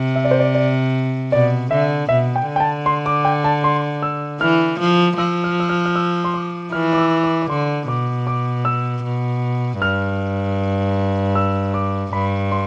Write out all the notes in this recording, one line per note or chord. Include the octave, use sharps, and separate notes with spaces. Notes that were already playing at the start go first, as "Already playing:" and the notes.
Already playing: C3
E5
D5
C5
D5
D5
B2 D5
D3 E5
B2 E5
G5
D3
G5
A5
C6
D6
G5
A5
C6
E6
E3 F6
F3
F3 E6
F6
E6
F6
F6
E6
C6
D6
E3 F6
D6
E6
D6
D6
D3 C6
B2 D6
D6
E6
B2
G2 F6
E6
D6
G2 B5
C6